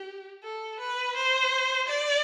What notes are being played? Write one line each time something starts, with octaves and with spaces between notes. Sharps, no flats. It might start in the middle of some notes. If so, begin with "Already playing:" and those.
Already playing: G4
A4
B4
C5
D5